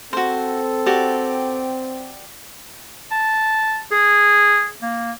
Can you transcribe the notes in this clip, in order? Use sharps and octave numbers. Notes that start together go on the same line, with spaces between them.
C4 F#4 A4 C5
F#4 G4 D5
A5
G#4
A#3